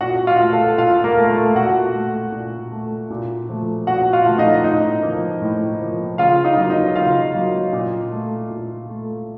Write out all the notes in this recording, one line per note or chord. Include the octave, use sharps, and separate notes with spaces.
A#2 F#4 F#5
F4 F5
A3
A4 A5
A#2 F4 F5
A#3 A#4
A3
A3 A4
A#2 F#4 F#5
A3
A#2
A3
A#2
F3 A3
A#2 F#4 F#5
F4 F5
F3 A3
D#4 D#5
A2 D#4 D#5
F3 A#3
A2
F3 A#3
C#3 F4 F5
D#4 D#5
F#3 A#3
D#4 D#5
C#3 F4 F5
F#3 A#3
A#2
A3
A#2
A3